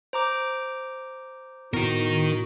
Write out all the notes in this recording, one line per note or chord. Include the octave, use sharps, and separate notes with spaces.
C5 A#5 D6
A2 B3 D#4 F#4 A#4